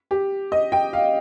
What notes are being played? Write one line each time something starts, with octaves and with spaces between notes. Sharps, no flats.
G4
D#5
G5
F5